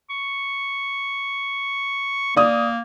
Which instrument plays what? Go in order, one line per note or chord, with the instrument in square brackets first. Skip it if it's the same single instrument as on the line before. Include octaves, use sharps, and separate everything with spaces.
[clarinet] C#6
[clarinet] A#3 [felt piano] D5 D#6